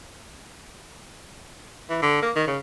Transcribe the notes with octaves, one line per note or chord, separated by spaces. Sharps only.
E3
D3
A#3
D#3
C#3